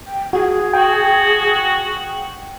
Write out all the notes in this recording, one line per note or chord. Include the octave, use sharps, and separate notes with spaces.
G5
F#4 G#4
F#4 G5